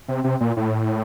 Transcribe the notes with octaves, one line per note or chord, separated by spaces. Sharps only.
C3
C3
A#2
A2